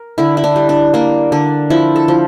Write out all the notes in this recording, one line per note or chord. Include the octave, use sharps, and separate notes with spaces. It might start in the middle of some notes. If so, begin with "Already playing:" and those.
Already playing: A#4
D3 E4
E4
D4
G3
D4
A#3 D4
D3 D4
F3 E4
A4
F3